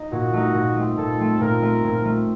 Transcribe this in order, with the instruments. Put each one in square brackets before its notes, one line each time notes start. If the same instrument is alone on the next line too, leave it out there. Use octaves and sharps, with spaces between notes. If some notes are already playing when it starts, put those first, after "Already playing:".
Already playing: [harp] D#4
[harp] A#2 [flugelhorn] F#4
[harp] A3 D#4
A#2
A3 C4
[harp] A#2 [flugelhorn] A4
[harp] A3 C4
[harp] A#2 [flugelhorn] A#4
[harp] A3 C4
A#2
A3 C4